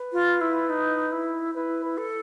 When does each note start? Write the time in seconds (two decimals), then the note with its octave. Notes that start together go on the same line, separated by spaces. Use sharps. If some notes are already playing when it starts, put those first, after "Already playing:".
Already playing: B4
0.13 F4
0.41 E4
0.69 D#4
1.12 E4
1.55 E4 B4
1.84 B4
1.98 A4